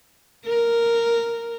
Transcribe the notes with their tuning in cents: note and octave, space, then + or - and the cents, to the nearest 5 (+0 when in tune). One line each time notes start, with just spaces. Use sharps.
A#4 -5